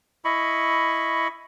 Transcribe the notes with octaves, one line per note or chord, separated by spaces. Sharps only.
E4 D#5 B5 C#6